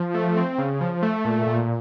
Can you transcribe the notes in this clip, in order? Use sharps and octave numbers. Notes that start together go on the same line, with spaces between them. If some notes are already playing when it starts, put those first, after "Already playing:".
Already playing: F3
A3
C4
C#3
F3
A3
A#2
A#2